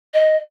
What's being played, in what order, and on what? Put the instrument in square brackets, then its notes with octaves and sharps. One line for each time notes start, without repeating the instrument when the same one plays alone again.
[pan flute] D#5